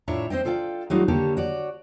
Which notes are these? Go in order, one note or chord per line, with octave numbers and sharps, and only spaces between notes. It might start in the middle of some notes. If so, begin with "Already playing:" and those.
A2 D4 F4 C#5 E5 A#5
C4 C5 D#5 G5
F4 A4 D5 F5 G5
F#3 G3 A3 D#4 F4 F#4
D3 A#3 G4 A4 C#5
F#4 C#5 D5